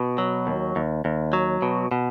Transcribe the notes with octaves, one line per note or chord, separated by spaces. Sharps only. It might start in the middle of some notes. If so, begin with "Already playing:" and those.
Already playing: B2
F#3
D#2
D#2
D#2
F#3
B2
B2